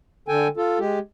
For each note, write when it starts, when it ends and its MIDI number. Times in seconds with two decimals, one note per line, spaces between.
0.28 0.48 50
0.28 0.48 69
0.28 0.48 79
0.28 0.48 80
0.57 0.79 65
0.57 0.79 69
0.79 0.99 56
0.79 0.99 67